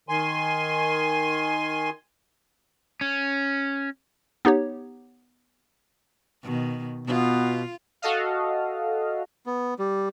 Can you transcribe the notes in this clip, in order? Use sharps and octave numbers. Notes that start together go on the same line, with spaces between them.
D#3 G#5 C6
C#4
B3 D#4 G4 C#5
B2 D#3
B2 B3 F4
F#4 A4 D#5 F5
B3
G3